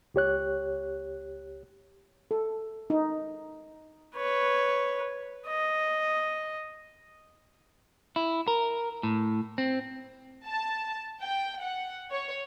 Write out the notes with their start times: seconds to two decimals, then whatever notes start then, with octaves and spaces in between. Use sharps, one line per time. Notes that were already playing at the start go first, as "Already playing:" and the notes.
0.14 C#2 G4 C#5 F#6
2.31 A4
2.90 D#4
4.16 B4 C#5
5.47 D#5
8.16 E4
8.48 A#4
9.03 A2
9.58 C4
10.46 A5
11.22 G5
11.61 F#5
12.11 C#5